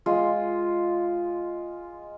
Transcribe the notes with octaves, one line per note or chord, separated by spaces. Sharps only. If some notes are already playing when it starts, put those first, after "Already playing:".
G#3 F4